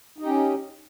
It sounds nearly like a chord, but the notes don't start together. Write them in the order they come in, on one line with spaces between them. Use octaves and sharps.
D#4 G4 C#4